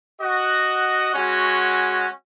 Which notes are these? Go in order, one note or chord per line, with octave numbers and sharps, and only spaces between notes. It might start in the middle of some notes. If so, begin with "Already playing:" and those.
F#4 D#5 F#5
G#3 C#4 F#4